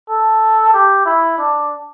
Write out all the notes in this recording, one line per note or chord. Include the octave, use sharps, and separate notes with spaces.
A4
G4
E4
D4